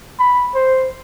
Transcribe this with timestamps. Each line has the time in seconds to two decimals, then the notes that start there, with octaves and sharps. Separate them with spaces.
0.19 B5
0.55 C5